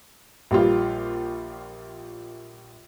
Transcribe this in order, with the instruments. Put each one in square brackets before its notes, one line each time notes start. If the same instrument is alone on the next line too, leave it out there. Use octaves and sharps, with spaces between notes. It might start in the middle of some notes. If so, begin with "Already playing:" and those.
[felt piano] A#1 G3 F4